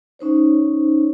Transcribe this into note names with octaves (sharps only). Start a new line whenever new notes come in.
C#4 D#4 C5 C#5